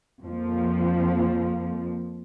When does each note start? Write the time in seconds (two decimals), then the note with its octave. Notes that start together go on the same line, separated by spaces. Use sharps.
0.23 F2 F3 A#3